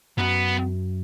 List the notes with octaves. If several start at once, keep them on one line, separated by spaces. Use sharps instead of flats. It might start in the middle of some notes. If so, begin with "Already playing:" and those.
F#2 B3